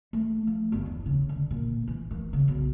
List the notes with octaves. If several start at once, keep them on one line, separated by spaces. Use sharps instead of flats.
A3
F3
G1
E2
C#3
D3
A#2
E3
A#3
C#3
B1